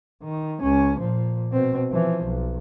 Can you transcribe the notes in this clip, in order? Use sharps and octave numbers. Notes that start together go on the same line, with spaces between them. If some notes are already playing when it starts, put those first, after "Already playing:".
D#3
C#2 C#4
A#2 F3
B2 C4
E3 F3
B1